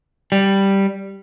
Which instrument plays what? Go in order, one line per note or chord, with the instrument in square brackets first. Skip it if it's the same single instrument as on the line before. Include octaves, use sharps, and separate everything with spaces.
[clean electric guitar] G3